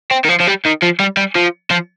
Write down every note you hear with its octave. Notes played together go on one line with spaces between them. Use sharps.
C4
D#3
F3
F3
G3
D#3
F3
G3
G3
F3
F3